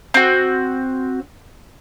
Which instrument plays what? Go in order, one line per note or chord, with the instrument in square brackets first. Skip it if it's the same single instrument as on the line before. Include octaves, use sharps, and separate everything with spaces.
[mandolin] C4 F#4